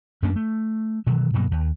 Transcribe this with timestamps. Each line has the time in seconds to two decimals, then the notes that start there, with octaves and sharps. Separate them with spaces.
0.22 F#2 A#3 C#4 D4
0.36 A3
1.07 B2 D#3 E3 F#3
1.33 G2 B2 F#3 A#3
1.51 D#2